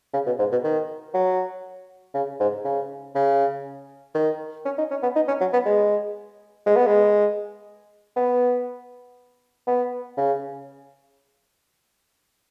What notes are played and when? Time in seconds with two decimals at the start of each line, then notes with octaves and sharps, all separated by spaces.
0.14 C#3
0.27 B2
0.39 G#2
0.52 B2
0.64 D#3
1.14 F#3
2.14 C#3
2.40 G#2
2.65 C#3
3.15 C#3
4.15 D#3
4.65 C#4
4.78 D#4
4.91 C#4
5.03 B3
5.16 D#4
5.28 C#4
5.40 F#3
5.53 B3
5.66 G#3
6.66 G#3
6.76 B3
6.86 G#3
8.16 B3
9.67 B3
10.17 C#3